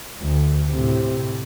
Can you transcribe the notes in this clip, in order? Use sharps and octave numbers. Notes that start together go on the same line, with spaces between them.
D2
A2 C3